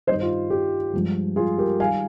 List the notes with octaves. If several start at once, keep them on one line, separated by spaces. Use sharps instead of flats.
G2 D#3 G3 C5 D#5
F4
G4
G2 F3 G#3
F4 G#4
G4 A#4
D#3 G3 F5 G#5